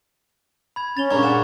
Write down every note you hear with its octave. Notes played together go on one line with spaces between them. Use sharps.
B5 G#6 F7
C#4 A6 F7 G7
G2 A#2 C#3 A#5 C#6 G#6
F#5 G#6 E7